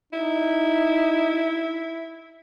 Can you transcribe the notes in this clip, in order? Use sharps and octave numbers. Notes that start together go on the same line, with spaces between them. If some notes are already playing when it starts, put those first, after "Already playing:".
D#4 E4